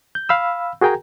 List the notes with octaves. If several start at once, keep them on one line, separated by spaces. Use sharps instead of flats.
G6
F5 B5 E6
F#4 G#4 A#4 G5 G#5 A#5